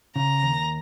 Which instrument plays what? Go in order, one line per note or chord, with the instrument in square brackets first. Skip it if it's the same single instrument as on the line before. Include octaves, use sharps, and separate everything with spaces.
[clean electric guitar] C#3 [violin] A#5
[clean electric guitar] D#2